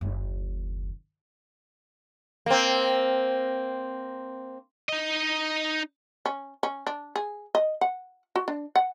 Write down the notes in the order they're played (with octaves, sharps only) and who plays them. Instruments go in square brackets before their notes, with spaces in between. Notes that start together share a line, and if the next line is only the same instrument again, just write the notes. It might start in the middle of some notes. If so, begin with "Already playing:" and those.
[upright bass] F#1 D#2
[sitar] A#3 C4
[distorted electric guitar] D#4 D#5
[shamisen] C#4
C#4
D4
G#4
D#5
F#5
F#4
D4
F#5